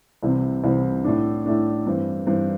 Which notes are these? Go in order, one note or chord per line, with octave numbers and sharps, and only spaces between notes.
C2 C3 E3 C4
C2 C3 E3 C4
A2 A3 D4
A2 A3 D4
G2 E3 C4
G2 E3 C4